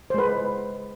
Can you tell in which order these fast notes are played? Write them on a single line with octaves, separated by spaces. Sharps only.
C5 G#3 B4